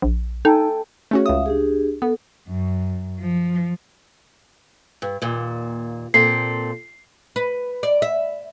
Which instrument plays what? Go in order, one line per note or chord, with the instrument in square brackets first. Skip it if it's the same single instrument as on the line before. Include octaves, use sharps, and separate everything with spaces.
[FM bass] A#1
[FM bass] D#4 [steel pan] A4 G5 G#5
[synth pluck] A3 C#4 F#4 [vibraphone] G#4 C#5
[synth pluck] C#2 D#6 [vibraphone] E5 F5
[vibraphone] D4 G4 G#4
[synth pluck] B3 [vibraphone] A4
[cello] F#2
F3
[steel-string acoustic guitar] G2
D#2 A#2
[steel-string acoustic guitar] A#2 C4 A4 [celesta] C7
[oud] B4
D5
E5